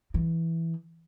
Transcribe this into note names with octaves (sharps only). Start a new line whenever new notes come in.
E3